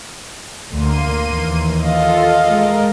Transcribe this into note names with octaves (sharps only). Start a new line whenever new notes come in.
D2 D3 A#3 C6 D#7
D#2 E3
F4 A4 D#5 F5
G#3 A#4